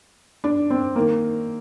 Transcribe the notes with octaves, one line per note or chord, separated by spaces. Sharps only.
D4
C4
D#3 A#3